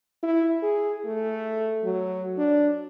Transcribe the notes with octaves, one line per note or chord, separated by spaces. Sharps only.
E4
G#4
A3
F#3
D4